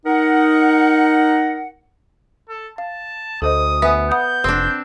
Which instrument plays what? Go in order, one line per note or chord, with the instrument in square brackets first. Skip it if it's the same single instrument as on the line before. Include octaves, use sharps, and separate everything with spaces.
[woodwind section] D#4 A#4 F#5
[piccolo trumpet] A4
[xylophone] F5 [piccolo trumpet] A5
[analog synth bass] D2 [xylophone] A4 C5 D#5 [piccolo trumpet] D#6
[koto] B3 [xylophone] E5 G#5
[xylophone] F#5 B5 D#6 [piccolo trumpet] G6
[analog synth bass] F1 [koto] C4 D4